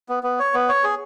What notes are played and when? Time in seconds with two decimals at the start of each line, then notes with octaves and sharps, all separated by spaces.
0.09 B3
0.23 B3
0.39 C#5
0.54 B3
0.69 C#5
0.84 G#4